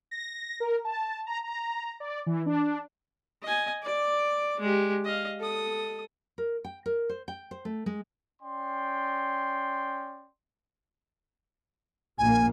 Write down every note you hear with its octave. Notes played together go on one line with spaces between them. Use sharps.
A#6
A#4
A5
A#5
A#5
D5
E3
D4
D#5 G#5
D5 D6
G#3 G4
D#5 F5
A4 D#6
A#4
G5
A#4
C5
G5
C5
A3
G#3
C#4 D5 G5 C6
A#1 A#3 G#5